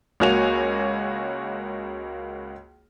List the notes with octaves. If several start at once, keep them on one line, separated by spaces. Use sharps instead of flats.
C#2 A#3 F#4 C#5 G#5 F7